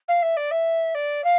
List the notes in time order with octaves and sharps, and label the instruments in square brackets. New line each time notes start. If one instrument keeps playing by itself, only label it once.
[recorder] F5
E5
D5
E5
D5
F5